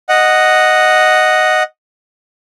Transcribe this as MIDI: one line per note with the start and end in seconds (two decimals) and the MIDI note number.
0.09 1.63 75
0.09 1.63 78